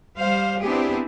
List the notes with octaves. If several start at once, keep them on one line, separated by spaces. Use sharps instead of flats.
G3 C5 F5
B3 C4 D4 E4 G4 G#4